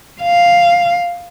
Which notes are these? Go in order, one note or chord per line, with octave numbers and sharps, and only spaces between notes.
F5